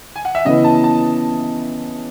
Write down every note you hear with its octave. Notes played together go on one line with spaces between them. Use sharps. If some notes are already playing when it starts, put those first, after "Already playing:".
G#5
F#5
E5
C#3 E3 B3 E4 D#5
A5
A5